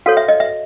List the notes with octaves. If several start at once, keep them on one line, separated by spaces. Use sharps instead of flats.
F#4 A4 C#5 F5
E5
D#5
E5